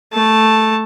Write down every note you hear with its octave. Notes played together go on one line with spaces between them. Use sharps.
A3 A5